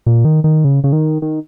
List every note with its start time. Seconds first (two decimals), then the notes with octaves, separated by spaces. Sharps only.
0.06 A#2
0.25 D#3
0.44 D#3
0.64 C#3
0.84 C#3
0.93 D#3
1.22 D#3